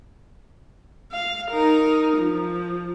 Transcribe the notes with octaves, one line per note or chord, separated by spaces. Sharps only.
F5
D#4 A#4
F3